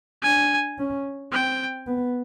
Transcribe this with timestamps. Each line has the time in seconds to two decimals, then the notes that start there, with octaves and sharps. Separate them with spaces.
0.23 D4 G#5
0.79 C#4
1.32 C4 G5
1.87 B3